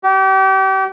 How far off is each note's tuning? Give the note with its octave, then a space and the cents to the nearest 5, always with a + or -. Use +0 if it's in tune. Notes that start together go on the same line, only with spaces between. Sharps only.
G4 -35